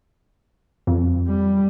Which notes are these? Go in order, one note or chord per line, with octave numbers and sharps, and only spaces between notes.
F2
G3